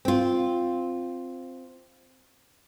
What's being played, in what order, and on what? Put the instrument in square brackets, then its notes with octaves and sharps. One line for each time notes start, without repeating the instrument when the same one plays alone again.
[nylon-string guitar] C4 F4